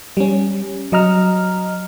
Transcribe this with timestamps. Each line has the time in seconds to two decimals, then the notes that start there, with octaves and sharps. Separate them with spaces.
0.17 G3 C#4
0.92 F#3 D#5 A#5 F6